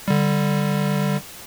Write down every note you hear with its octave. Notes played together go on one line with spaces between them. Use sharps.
D3 G3